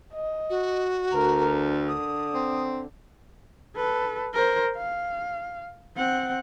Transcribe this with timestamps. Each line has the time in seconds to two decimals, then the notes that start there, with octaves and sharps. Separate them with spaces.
0.14 D#5
0.50 F#4
1.13 D2 A#4
1.57 D3
1.88 D#6
2.34 C4
3.76 A4 B4
4.34 A#4 C5
4.76 F5
5.97 C4 F#5